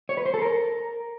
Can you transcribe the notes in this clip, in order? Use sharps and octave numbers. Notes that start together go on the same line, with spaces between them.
C#5
B4
C5
A4
A#4